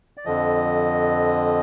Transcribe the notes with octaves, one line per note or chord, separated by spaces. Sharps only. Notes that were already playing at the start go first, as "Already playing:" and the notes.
D5
F2 D3 F3 D#5